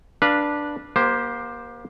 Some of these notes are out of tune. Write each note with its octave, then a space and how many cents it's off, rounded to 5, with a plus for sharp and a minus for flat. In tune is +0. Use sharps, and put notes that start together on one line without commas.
D4 +0 B4 -20 F5 -15
A#3 +30 G4 +0 C5 +0